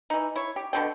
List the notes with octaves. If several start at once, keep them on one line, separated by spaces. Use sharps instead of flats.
E3 D#4
E4 C#5
G4
B2 D3 G5